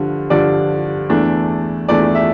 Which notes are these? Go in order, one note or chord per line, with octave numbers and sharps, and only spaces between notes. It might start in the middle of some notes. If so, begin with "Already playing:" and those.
Already playing: G2 D3 F3
G2 D3 F3 D5
E2 E3 A3 D4
E2 E3 A3 D4 D5
E5